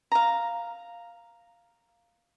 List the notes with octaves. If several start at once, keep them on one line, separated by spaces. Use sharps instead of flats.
F5 A#5